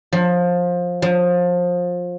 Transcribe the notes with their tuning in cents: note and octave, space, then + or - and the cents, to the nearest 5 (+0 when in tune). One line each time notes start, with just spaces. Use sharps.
F3 +20
F3 +25